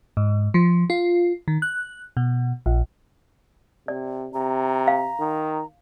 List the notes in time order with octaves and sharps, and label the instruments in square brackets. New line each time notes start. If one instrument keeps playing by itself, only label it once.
[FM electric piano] G#2
F3
F4
D#3
F#6
B2
A#1
[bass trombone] C3 [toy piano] D5
[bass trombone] C3 [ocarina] A#5
[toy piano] F5
[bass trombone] D#3